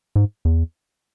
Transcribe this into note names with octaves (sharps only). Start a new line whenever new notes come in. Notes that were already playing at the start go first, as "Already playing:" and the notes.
G#2
E2